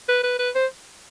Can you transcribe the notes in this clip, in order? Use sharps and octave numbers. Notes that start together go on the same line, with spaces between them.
B4
B4
B4
C5